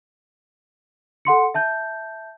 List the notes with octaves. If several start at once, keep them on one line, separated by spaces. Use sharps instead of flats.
A4 F#5 C6 C#7
E5 A5 G6